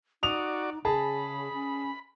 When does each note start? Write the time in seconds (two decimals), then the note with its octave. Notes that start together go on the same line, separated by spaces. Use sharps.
0.23 D#4 F#4 D5 D#6 F7
0.85 C#3 G#4 A5 B5
1.53 C#4